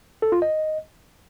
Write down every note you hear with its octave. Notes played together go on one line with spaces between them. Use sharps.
A4
F4
D#5